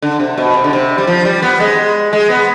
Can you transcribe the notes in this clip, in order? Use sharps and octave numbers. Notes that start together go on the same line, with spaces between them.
D3
C3
B2
C3
D3
C3
G3
F3
G3
B3
G#3
G#3
B3